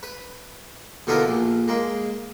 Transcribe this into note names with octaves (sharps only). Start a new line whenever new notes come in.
B4
B2 D3 B3 E4 F4 A#4
A#1
G#3 A#3